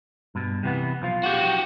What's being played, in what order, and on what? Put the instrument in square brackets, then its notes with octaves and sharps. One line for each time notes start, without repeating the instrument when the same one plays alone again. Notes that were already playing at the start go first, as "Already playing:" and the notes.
[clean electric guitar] G2 B2
C3 E3 B3
B1 F3 F4
[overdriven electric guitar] F#4 G4